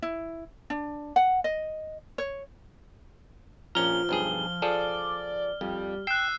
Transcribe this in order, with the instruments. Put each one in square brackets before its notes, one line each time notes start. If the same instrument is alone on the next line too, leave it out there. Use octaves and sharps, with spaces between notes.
[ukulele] E4
D4
F#5
D#5
C#5
[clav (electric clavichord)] A#1 C#4 A#5 [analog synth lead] F3 [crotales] F6 G7
[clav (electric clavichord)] B1 G2 G#4
[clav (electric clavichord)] F3 G#4 A4 [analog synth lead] D5
[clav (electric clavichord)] F2 [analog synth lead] G3
[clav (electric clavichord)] G5 [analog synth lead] E6 [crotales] F#6 C7